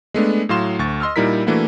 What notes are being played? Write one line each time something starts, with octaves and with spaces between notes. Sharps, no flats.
G#3 A3 B3 D4
A2 F#3 F5 C6 E7
D2 C#6 A6
D#5 C6 E6 F6
A#2 G3 D#4 E4 A#4 B6
E3 A3 A#3 D4 E4 F#4